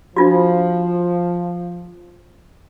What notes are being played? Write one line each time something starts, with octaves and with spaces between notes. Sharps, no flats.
F3 D4 F4 F#4